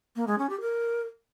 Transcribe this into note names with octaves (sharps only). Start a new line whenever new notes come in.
A#3
G#3
C#4
G4
A#4